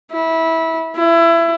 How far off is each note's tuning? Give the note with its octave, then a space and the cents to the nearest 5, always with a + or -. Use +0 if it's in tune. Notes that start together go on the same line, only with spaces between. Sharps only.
E4 -20
E4 +25